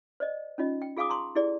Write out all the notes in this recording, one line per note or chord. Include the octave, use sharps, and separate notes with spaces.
C5 D5 D#5
C#4 D#4 F4 D#5
G5
F4 G#4 F5 G#5 D6 D#6
A5 A#5 C6 C#6
E4 G4 G#4 D5